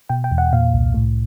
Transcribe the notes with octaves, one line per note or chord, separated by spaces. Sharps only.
B2 G5
G5
E2
F#5
A#2 F5
C2
A2